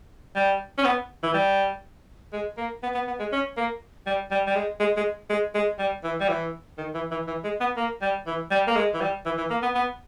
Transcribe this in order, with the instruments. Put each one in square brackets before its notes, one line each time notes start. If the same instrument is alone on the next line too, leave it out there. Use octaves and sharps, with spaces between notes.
[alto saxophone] G3
C#4
B3
E3
G3
G#3
A#3
B3
B3
B3
G#3
C#4
A#3
G3
G3
G3
G#3
G#3
G#3
G#3
G#3
G3
E3
G3
E3
D#3
E3
E3
E3
G#3
B3
A#3
G3
E3
G3
A#3
G#3
E3
G3
E3
E3
A#3
B3
B3